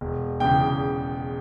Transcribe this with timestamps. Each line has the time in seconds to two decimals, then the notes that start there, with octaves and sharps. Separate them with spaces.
0.01 E1
0.40 E2 C#3 G5